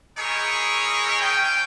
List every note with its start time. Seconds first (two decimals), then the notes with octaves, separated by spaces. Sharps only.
0.18 D#4 E4 G#4 A#4 C#5
1.21 C#4 F4 G5